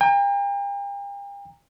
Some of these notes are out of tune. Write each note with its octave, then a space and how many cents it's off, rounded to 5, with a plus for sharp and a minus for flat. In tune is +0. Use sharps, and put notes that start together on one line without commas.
G5 +40 A#5 -10